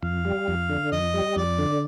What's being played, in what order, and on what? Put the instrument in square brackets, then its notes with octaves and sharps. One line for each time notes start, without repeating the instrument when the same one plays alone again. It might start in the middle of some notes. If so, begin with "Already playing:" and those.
[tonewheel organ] F2 [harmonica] F5
[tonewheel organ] G3
F2
D3
[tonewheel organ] F2 [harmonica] D#5
[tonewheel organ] G3
[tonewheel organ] F2 [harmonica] D5
[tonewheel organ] D3